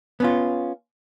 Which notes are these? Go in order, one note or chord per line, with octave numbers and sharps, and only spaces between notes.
B3 C#4 F4